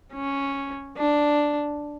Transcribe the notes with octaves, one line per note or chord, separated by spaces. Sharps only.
C#4
D4